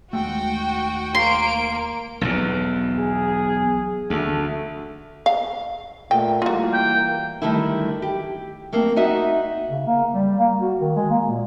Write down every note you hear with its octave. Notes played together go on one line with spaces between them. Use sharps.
D#2 G#3 A3 F#4 G5
A#3 C6 D7
B1 E2
G#4
D2 A3
F5
A#2 A3 G5
E3 G3 A#3 F4 F#4
G5
D3 D#3 G3 A3 A#3 E4
G4
A3 A#3 C4
D#4 F#4 D#5 E5 F#5
C#3
A#3
G3
A#3
F#4
D#3
G#3
A#3
A#2